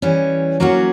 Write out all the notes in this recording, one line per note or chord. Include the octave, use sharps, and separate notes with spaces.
E3 G3 C#4
F#3 A#3 C#4 F#4